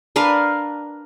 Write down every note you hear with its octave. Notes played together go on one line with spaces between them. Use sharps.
D4 A#4 B4 F5